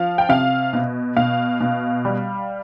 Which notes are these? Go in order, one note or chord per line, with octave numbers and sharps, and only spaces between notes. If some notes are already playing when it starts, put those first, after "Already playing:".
Already playing: F3 F5
G5
C3 F5
B2
B2 F5
B2
G3